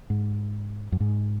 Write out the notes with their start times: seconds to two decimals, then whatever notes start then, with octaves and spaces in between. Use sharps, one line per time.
0.10 G#2
0.92 F#2
1.00 G#2